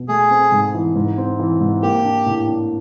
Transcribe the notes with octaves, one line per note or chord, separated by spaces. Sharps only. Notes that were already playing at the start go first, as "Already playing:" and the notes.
Already playing: B2
A3 G#4
C4
G#2
E3
G#2
C4
E3
G#2
A#3 G4
D4
A2
D4